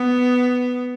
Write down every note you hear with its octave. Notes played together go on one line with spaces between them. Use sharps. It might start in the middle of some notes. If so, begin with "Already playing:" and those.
Already playing: B3